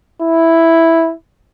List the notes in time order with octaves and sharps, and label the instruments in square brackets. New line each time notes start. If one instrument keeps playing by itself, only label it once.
[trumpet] E4